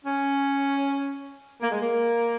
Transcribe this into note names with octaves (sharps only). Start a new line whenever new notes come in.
C#4
A#3
G#3
A#3